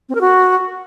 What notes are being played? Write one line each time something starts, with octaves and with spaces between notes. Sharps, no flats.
C4
A#4
F#4